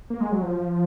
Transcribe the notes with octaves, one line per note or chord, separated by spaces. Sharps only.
A#3
G#3
F#3
F3